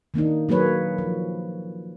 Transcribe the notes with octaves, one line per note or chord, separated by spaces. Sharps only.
D#3 A#3 D4 D#4
F#3 A#3 G#4 B4 C#5
F3